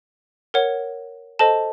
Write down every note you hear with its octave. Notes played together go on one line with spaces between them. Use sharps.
A#4 C#5 F#5
A4 C5 D#5 A5